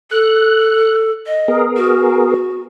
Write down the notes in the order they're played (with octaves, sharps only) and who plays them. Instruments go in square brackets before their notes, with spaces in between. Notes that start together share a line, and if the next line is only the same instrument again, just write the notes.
[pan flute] A4 [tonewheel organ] F#6
[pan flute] D#5
[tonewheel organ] B3 G#4 A#4
[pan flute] F#4